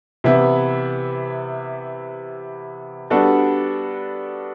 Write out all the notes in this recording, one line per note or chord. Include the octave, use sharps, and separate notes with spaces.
C3 E3 B3 E4
G3 B3 D4 F#4 A4